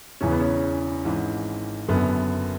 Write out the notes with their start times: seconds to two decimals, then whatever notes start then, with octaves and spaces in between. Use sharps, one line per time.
0.21 E1 E2 C#3 E3 C#4
0.31 B3
0.40 C#4
1.05 G#1 G#2 E3
1.88 F#1 F#2 D3 B3